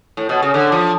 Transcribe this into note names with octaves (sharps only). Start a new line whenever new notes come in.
A2
B2
C#3
D3
F3